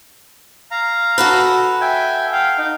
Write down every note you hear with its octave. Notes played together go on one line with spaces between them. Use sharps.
F5 A#5
F#4 A4 B4
E5 G5 G#5
F5 G5
D#4